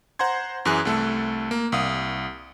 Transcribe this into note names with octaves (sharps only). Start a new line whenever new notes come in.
C5 F#5 A#5 C6 G#6
F#2 E3 G#4 F#6
C2 A3 A4
A#3
C2 F5 D#6